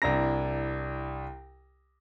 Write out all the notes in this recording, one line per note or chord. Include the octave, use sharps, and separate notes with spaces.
C2 D4 E4 A#5 A#6